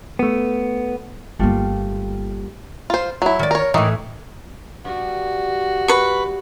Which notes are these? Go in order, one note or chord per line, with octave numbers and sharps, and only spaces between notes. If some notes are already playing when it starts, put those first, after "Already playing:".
A3 B3
G1 G3 A3 A#3 F4
F4 C5
F#3 E4
D#3 D5
A#4 C#5
A2 D#3 E3
G2 F#4
B4 C#6